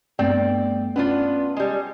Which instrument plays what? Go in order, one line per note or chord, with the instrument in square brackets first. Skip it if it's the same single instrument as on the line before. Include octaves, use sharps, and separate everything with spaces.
[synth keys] G2 A3 B3 [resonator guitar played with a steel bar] C4 D5 G5
[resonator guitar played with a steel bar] B3 D4 F4 [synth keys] C#4
[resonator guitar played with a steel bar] G3 G#3